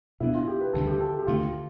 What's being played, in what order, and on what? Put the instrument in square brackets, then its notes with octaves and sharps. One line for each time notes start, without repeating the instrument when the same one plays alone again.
[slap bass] B2 B3 D4 [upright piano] E4
[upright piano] F4
G4
B4
[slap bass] D2 D3 G3 [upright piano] A4
[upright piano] G4
A4
G4
[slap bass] D2 D3 A3 [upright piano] F4